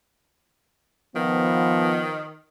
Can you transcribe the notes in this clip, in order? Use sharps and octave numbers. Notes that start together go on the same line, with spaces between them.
D#3 F3 B3